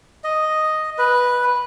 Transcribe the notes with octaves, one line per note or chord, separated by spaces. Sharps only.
D#5
B4